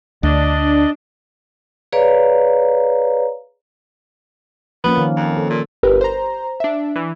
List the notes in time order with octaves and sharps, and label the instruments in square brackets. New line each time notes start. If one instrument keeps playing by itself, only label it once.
[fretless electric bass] D2 [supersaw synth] D4 [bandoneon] D5 D#5
[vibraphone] G#4 B4 C#5 D5 F5 A#5
[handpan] F3 A#3 C#4 [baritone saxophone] B3
[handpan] D#3
[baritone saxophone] F2
[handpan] A4
[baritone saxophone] A#2
[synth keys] G1 G4 A#4 B4
C5 A#5
D4 E5
E3